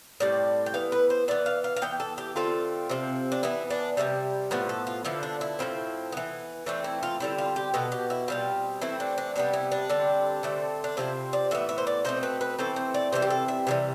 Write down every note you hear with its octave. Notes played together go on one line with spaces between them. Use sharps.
A2 G3 C4 D5
G5
E3 B3 F5
B4
C5
E3 B3 D5
F5
F5
F5
E3 B3 G5
A4
G4
D3 A3 C4 F4
C3 F3 C4
D4
E3 B3 E4
D4
C3 E3 G3 E4
A2 F3 B3 B4
A4
F4
D3 F3 B3 E4
D4
E4
A2 F3 C4
E3 B3
E3 A3 C4 D4
E4
F4
D3 G3 C4 E4
F4
G4
B2 B3 A4
G4
E4
B2 G3 C4 F4
E3 A3 C4 E4
D4
D4
C3 G3 B3 D4
E4
D4
D3 G3 C4
D3 A3 C4
D4
C3 F3 C4 E4
D5
A2 E3 B3 E5
E5
C5
D5
B2 A3 C4 C5
B4
B4
E3 A3 C4 A4
C5
D5
C3 E3 G3 C4 C5
G4
A4
E5
C3 E3 G3